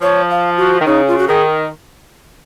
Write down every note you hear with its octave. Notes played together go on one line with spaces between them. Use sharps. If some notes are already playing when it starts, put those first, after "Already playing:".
F3 C#5
F5
F#4
D#3
C#3 D#4
F4
F#4
D#3 G#4